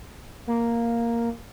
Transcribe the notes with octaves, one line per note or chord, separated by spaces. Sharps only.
A#3